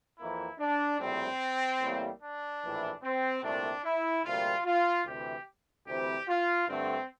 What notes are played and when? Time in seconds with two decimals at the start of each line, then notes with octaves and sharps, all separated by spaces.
0.18 F2 E3 A#3 E4
0.60 D4
1.00 A#1 A2 G3 C4
1.81 A1 A2 G3 A#3
2.22 D4
2.62 A#1 A2 E3
3.03 C4
3.43 C2 A#2 A3 C4 D4
3.84 E4
4.25 D2 C3 G3 A#3 F4
4.66 F4
5.06 D2 C3 E3 G4
5.87 D2 C3 E3 G3 C4 G4
6.29 F4
6.69 G2 D3 A3 C4